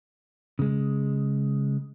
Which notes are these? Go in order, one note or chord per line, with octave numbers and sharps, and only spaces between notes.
C#3 G#3